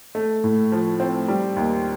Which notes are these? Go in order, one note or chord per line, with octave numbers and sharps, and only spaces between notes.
A3
A2
F3
C4
G3
D#2